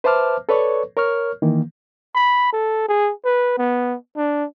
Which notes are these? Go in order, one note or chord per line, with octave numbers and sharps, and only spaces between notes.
B4 C5 E5 A5 D6 F6
A4 B4 C#5 D5 C#6
A#4 C#5 C#6 F6
D#3 E3 A#3
B5
A4
G#4
B4
B3
D4